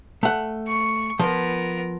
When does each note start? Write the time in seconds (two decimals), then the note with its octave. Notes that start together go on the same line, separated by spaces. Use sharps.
0.23 A3 F#5
0.67 C#6
1.19 F3 B3 A#4